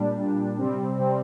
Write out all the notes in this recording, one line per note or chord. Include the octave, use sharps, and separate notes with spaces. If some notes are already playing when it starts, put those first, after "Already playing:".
Already playing: A#2 G3 D4
A#2 G3 D4
C3 G3 C4
C3 G3 C4